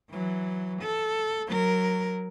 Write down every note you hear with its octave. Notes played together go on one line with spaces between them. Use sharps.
E3 F#3
A4
F#3 A#4